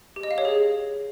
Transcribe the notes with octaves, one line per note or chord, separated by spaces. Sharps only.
G4
D#5
F5
C#5
G#4